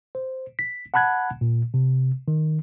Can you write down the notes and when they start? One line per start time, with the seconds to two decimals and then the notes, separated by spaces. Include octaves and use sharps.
0.15 C5
0.59 B6
0.94 F#5 A5 B5 F#6 G#6
1.41 A#2
1.74 C3
2.28 D#3